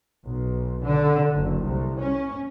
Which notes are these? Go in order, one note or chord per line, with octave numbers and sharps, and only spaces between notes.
B1
D3
F#1
C2
C#4